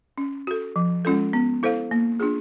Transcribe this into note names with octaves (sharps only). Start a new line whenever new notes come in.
C#4
F#4 A4
F3
G#3 C#4 F4 A4
B3
E4 A4 C5 F5
A#3
D4 F4 G#4